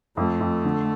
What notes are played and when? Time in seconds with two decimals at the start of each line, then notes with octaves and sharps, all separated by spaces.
0.17 F2 A3
0.40 F2
0.65 D3